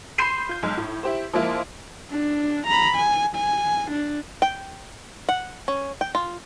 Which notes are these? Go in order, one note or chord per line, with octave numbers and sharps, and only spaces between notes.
B5 C6 G6 C7 D#7 E7
F4 G6
B1 G#3
A2
E4 G4 C5
F3 G#3 A#3 E4 F4
D4
A#5 B5
G#5
G#5
D4
G5
F#5
C#4
G5
F4